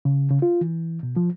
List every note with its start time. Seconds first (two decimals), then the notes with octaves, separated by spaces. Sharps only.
0.05 C#3
0.31 C#3
0.42 F4
0.61 E3
1.03 B2
1.16 F3